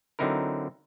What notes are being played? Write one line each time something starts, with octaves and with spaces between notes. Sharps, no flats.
D3 F#3 C4 D#4 E4 A#4